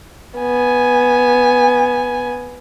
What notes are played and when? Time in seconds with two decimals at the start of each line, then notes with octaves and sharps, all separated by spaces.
0.40 B3 G#5